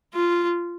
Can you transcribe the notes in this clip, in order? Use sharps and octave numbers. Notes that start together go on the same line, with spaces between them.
F4